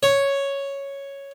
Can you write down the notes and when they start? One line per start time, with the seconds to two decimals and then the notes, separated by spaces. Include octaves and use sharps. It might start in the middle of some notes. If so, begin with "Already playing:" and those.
0.03 C#5